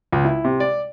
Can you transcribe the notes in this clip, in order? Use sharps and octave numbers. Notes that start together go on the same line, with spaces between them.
C#2
E4
C3
D5